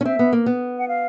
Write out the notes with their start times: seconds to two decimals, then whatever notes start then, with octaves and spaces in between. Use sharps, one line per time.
0.01 C#4
0.05 C4 E5
0.19 B3
0.33 A#3
0.46 B3
0.78 F#5
0.88 F5